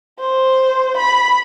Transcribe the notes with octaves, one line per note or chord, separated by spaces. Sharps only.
C5
B5